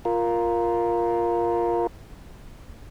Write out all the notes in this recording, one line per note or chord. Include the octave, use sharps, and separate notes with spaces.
F4 A#4